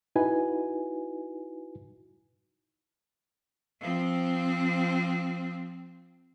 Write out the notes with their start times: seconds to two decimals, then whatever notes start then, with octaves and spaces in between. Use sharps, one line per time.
0.16 D#4 E4 F#4 B4 G#5
3.81 F3 C4